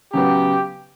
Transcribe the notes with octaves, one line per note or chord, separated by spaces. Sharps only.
C#3 F#3 B3 G4